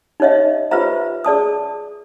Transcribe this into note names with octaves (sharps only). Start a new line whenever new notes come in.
D#4 G4 C#5 D#5 E5
F4 G4 B4 C5 E5 A#5
G#4 D5 A5 D#6